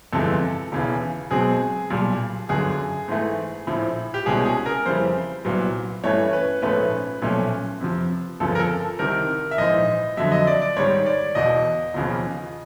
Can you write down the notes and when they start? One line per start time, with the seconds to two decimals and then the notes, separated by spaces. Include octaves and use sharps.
0.12 G1 F2 C3 E3 G#3 A4
0.72 E1 D#2 C#3 E3
1.30 B1 B2 G#3 C4 G#4
1.90 B1 A#2 G3
2.49 G1 F#2 D3 G#4
3.08 G#2 E3 A3
3.67 A#1 A2 F3
4.14 G4
4.26 C2 B2 G#3 C#4 G#4
4.45 G#4
4.66 A#4
4.86 F2 C#3 E3 G3 C5
5.44 C2 A#2 F#3 B3
6.04 G2 E3 A3 C#4 C#5
6.33 B4
6.62 A#1 G#2 F3 A3 C#4 B4
7.22 B1 A#2 F3 A3 C#4
7.81 F2 C3 F3
8.40 G1 F2 C#3 F3 A4
8.55 A#4
8.60 A4
8.99 C2 C3 D#3 A#4
9.51 E5
9.58 A#1 G#2 E3 D#5
10.17 F2 D3 F#3 E5
10.32 D#5
10.47 D5
10.62 D5
10.77 G#2 D#3 G3 C#5
11.06 D5
11.35 E1 E2 B2 D#5
11.94 E1 D#2 C#3 F3